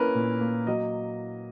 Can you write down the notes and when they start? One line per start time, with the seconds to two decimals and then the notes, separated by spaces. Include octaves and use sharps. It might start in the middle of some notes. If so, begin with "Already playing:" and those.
Already playing: A#3 C#4 E4 A#4 B4
0.15 A#2
0.41 A#3
0.67 F#3 D#5